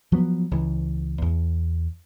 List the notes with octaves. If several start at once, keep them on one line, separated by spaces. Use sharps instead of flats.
F3 F#3 B3
C#2 E3
E2